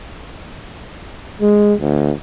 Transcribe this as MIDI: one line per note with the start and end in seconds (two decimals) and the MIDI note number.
1.42 1.74 56
1.79 2.12 38